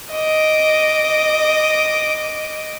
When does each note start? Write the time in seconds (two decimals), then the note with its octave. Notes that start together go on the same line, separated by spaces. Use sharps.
0.12 D#5 D6